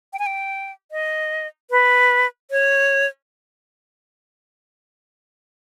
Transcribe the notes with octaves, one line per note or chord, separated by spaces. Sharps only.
G5
G#5
G5
D#5
B4
C#5